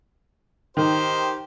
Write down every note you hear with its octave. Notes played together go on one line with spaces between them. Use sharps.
D#3 D#4 G4 C5